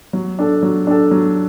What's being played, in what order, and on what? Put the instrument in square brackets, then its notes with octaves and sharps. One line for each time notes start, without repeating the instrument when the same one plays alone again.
[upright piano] F#3
D4 A4
F#3
D4 A4
F#3